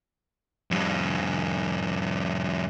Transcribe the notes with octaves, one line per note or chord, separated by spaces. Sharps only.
F2 G3